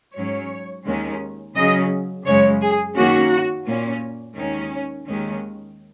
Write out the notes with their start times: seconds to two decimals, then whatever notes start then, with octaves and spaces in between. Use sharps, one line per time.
0.15 G#2 F#3 C#4 C#5
0.85 D#2 D#3 G#3 C#4
1.55 C#3 F#3 C#4 D#5
2.25 F#2 C#3 G#3 C#5
2.61 G#4
2.95 F#2 D#3 A#3 C#4 F#4
3.66 A#2 A#3 C#4
4.36 D#2 D#3 G#3 C#4
5.07 D#2 D#3 G#3 C#4